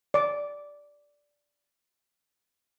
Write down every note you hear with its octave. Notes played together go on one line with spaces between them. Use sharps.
D5 D6